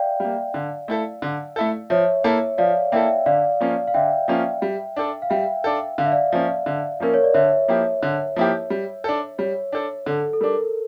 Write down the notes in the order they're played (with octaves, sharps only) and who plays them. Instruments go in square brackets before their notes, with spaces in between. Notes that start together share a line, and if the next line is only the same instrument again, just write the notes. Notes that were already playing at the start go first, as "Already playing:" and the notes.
Already playing: [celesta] D5 E5 F5 G5
[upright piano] G3 A#3
D3
A3 E4 A4
D3
A3 E4 A4
[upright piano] F3 [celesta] C#5 E5
[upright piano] A#3 E4 A4
[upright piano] F3 [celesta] D5 F5
[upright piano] A#3 E4 A4 [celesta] E5 G5
[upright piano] D3 [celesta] D5 F5
[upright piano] F3 A#3 C#4 F4
[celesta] F5
[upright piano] D3 [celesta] E5 G5
[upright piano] F3 A#3 C#4 F4
G3
D4 A4
[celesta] F5
[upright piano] G3 [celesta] E5 G5
[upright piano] D4 A4
[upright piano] D3 [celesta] F5
[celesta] E5
D5 F5
[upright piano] F3 A#3 C#4
D3
[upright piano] F3 A#3 C#4 [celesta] A#4
[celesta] C#5
D5
[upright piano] D3 [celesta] C#5 E5
[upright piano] F3 A#3 E4 G4
D3
F3 A#3 E4 G4
G3
D4 A4
[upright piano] G3 [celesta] C#5
[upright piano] D4 A4
[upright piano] D3 [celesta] A4
[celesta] A4
[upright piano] G3 D4 [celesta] A#4